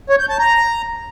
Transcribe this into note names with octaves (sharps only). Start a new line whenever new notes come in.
C#5
G6
A5
A#5